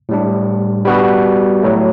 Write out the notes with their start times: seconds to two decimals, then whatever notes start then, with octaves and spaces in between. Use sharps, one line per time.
0.09 A2 G3 D4
0.85 G3 B3 F#4 B4
1.62 A2 F#3 A3